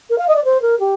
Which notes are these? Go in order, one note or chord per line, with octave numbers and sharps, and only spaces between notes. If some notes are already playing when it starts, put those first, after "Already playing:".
A#4
F5
D#5
D5
C5
A#4
G4